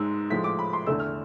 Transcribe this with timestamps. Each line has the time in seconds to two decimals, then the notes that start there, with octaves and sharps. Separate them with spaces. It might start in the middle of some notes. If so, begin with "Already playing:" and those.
Already playing: G#2 G#3 E6
0.30 A2 F3 G#3 B6
0.44 D6
0.59 B5
0.73 C6
0.87 E2 D3 A3 E6
1.00 F6